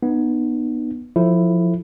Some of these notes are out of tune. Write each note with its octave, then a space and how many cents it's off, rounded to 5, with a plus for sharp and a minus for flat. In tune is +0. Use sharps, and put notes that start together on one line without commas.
B3 -10 D#4 -35
F3 +10 E4 +5 A4 -5